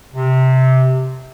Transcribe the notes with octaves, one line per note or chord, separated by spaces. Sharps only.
C3